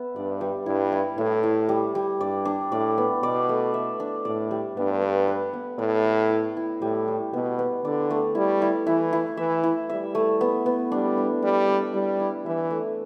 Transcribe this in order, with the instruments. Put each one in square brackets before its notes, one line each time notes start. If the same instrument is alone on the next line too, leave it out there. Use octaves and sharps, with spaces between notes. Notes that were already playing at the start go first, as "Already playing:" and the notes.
Already playing: [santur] B3 E5
[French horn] G2 [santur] D5
[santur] G3
[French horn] G2 [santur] E4
[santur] E4
[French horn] A2 [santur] E4
[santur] E4
G3
G3
[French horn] G2 [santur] D5
[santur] D4
[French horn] A2 [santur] D5
[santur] B3
[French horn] B2 [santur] D5
[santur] A3
E5
D4
[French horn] A2 [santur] D5
[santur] G3
[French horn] G2 [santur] B3
[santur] B3
B4
B3
[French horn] A2 [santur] D5
[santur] A3
E4
E4
[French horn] A2 [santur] G3
[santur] G3
[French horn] B2 [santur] B3
[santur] B3
[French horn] D3 [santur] D5
[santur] A3
[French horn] G3 [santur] E4
[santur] E4
[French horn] E3 [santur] E4
[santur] E4
[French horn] E3 [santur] E5
[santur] E4
[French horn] G3 [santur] E5
[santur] A3
B3
B3
[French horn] G3 [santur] D4
[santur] D4
[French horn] G3 [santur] D4
[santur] D4
[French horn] G3 [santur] E4
[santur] E4
[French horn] E3 [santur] E5
[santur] A3